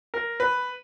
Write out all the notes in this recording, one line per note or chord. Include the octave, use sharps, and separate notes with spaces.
A#4
B4